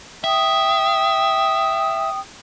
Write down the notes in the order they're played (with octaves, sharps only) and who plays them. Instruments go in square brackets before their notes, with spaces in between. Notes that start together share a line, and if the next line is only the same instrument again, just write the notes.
[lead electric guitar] E5 [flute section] G5 D#6